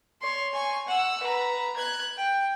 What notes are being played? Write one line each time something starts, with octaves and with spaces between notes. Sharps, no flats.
C#5 C6
G#5 C#6
F#5 E6
B4 A#5
F#6 G#6
G5